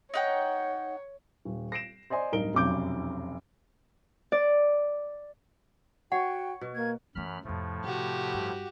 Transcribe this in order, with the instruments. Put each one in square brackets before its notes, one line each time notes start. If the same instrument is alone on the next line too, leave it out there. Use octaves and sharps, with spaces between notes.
[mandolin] D#4 F#5 G5 [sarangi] C#5
[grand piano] D#1
A#6 C7 D7 E7
C5 D5 D#5 G#5 C6
D1 G2 D#4 A#4 D7 G7
F1 B1 F#2 D6 G6 D7
[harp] D5
[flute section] F#4 G5 [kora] C#5 [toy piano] F#5
[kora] B2
[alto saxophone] A#3 [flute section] G#6
[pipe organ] F#2 B5 F6 [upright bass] E3 A3
[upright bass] F2 C3 [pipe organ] A2 F3 A3
[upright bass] C3 [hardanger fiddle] F#4 G4
[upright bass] G2